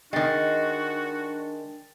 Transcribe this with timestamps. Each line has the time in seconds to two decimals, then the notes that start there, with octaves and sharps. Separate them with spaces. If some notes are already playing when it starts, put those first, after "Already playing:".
0.13 D#3 G#3 D4 F#4 G5 A6